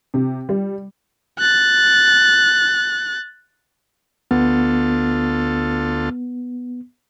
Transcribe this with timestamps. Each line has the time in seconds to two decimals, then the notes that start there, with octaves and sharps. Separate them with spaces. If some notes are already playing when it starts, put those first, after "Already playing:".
0.14 C3
0.49 G3
1.39 F#6 A6
4.31 D2 B3 F4 A4